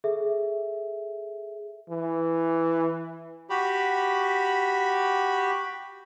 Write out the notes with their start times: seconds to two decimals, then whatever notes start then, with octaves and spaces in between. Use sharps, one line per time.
0.04 G#4 A4 E5
1.90 E3
3.50 F#4 G4 B5